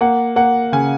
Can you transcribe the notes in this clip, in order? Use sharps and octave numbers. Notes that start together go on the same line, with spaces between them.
A#3 F#5
A#3 F#5
C#3 G#5